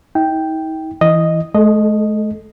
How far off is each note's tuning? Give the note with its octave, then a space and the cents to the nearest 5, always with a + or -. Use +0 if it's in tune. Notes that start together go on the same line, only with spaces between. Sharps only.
D#4 +45 G5 +0
E3 +0 D#5 +0
A3 -45 A4 +0 D#5 +0